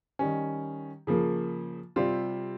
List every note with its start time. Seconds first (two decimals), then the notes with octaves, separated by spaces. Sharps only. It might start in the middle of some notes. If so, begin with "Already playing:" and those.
0.19 D#3 G3 C#4
1.07 C#3 F3 A#3
1.96 C3 G3 C4 F4